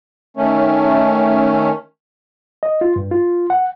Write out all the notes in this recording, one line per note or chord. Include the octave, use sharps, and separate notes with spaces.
D#3 A3 C#4
D#5
F4
G2
F4
F#5